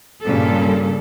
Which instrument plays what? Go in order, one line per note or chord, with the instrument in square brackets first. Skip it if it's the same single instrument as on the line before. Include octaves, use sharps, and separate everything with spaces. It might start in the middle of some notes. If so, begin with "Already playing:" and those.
[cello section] G2 A#2 C#3 G3 A4